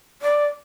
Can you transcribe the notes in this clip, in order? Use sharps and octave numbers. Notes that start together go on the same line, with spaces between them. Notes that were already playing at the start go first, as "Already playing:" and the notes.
D5